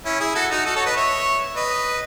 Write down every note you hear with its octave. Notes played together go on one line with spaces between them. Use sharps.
C#4 E4
E4 G#4
F#4 A4
D#4 F#4
F#4 A4
A4 C#5
B4 D#5
C#5 E5
B4 D#5